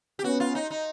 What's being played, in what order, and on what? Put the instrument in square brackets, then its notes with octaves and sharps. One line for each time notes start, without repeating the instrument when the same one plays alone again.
[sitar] G4
[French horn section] B3 C#4 [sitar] F#4
[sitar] F4
D#4
D#4